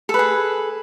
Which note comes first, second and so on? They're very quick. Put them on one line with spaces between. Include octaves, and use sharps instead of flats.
A4 B4 G#4